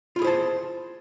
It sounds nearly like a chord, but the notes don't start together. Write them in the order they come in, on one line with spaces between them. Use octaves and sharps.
F4 E4 G#4 C5 A5